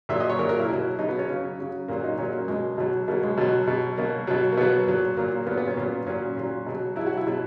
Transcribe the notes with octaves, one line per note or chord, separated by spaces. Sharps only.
A#2 F#3 E5
D#5
C#5
A#2 F#3 A#4
A#4
E4
B2 F#3
B2 F#3 D#4
B3
C#4
C#3 F#3
C#3 F#3
A#2 F#3 A#3
D#4
A#2 F#3 C#4
A#3
B2 F#3 G#3
B2 F#3
B2 F#3 A#3
G#3
B2 F#3
B2 F#3
B2 F#3 A#3
B2 F#3
A#3
B2 F#3 B3
A#2 F#3
A#2 F#3 A#3
A#3
A#2 F#3 B3
B3
C#4
A#2 F#3 B3
A#2 F#3 C#4
A#2 F#3
B2 F#3
B2 F#3 E4
F#4
E4
B2 F#3